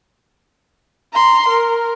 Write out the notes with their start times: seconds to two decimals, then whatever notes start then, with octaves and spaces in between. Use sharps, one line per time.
1.13 A#5 C6
1.49 A#4